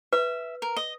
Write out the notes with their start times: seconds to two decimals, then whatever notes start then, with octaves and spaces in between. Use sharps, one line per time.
0.13 B4 E5
0.62 A#4
0.76 D#5